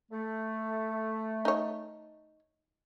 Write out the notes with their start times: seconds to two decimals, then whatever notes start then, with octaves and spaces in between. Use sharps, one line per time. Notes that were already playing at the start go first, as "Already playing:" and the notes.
0.12 A3
1.45 D#4 C#5